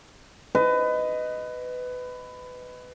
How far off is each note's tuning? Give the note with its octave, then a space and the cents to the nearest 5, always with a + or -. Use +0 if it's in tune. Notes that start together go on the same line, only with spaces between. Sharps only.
B4 +20 D#5 +0